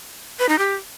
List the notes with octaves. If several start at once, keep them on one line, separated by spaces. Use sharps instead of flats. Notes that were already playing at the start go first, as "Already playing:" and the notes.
B4
D#4
G4